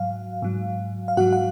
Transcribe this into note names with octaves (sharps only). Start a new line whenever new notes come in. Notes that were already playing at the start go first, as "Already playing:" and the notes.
Already playing: G#2 F#3 F5
G#2 F#3
F5
G#2 F#3 F#4 F#5
F#5